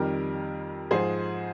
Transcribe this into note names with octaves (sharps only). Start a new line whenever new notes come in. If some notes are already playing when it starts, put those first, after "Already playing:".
Already playing: F2 D#3 G3 G4 A#4
G#2 F3 G#3 G#4 C5